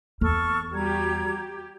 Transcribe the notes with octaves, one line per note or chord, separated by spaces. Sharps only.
E2 A4 C#6 F6
G3 F#4 G4 A#5 G#6
G4